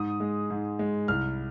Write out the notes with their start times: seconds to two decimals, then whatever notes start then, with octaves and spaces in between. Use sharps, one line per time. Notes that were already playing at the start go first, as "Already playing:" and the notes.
Already playing: G#2 D#6
0.20 G#3
0.50 G#2
0.79 G#3
1.08 C2 F6